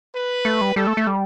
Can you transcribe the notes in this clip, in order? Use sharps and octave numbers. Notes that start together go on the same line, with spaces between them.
B4
A3
G3
G3 A4
A3
A3
G3